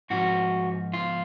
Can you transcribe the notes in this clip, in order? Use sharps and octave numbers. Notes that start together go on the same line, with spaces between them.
G#2 F3 F#4
F4